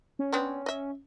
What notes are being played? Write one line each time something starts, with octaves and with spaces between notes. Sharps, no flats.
C#4
B3 C4 D4
D#5 E5